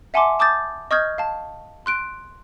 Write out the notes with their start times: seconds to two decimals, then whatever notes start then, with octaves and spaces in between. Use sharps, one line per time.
0.14 E5 F#5 G#5 A5 C6 D6
0.39 A5 D6 D#6 G6 A6
0.91 D#5 C#6 D#6 F6 G6 G#6
1.18 F5 A5
1.86 C6 F#6 D7